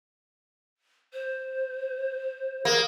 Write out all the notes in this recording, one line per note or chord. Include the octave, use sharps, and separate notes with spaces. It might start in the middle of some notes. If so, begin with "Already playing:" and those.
C5
A#3 G#4